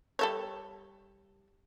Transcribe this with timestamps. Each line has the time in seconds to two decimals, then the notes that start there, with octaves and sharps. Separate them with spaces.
0.19 G3 A4 C#5